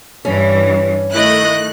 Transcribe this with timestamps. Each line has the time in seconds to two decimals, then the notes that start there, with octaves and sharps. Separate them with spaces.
0.25 G2 E3 C#4
1.12 D#3 A3 E4 D#5 F#6